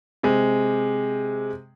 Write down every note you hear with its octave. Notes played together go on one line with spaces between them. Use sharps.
C3 G#3